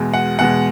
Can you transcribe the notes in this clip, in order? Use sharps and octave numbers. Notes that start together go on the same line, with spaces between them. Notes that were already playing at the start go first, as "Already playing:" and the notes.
Already playing: E2 B2 G#3
F#5
E2 B2 G#3 F#5